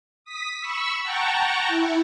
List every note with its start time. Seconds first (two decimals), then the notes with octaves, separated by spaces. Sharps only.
0.24 D#6 B6
0.60 B5 C#6 E6
1.02 F#5 G5 A5 A#5 C#6
1.68 E4